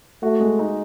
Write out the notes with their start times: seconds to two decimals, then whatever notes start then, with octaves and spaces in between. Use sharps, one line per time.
0.23 A3 F#4
0.40 G#3
0.59 D#4